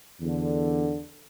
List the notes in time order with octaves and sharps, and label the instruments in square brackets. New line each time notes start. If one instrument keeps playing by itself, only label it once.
[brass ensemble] E2 D3